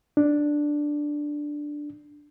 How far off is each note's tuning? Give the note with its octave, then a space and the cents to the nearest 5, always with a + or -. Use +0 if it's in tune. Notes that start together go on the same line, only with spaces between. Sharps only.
D4 +5